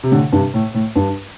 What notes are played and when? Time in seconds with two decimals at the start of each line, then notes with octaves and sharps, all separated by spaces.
0.03 C3
0.11 A2 D3
0.33 G2 C3
0.54 A2
0.74 A2
0.96 G2